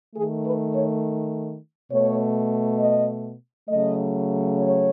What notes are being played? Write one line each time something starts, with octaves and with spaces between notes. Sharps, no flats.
D#3 A3 G#4
B4
C#5
B2 A3 C#5
D#5
C#3 F#3 A3 D#5
C#5